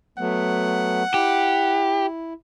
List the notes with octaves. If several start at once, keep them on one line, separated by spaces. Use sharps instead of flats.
F#3 A3 B3 F#5
E4 G4